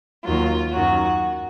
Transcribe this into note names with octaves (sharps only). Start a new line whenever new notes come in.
D#2 D#3 F#3 F4
F#2 D#3 F#3 F#4